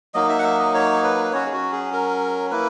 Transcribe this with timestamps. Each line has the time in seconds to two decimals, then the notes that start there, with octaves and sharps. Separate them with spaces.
0.14 F#3 A#3 D#4 D#5
0.29 E5
0.39 F#5
0.44 E5
0.59 D#5
0.75 C#5
1.04 B4
1.24 B4
1.33 F#3 C#4 F#4 C#5
1.46 G#4
1.54 F#4
1.72 G#4
1.93 A#4
2.51 A#3 E4 B4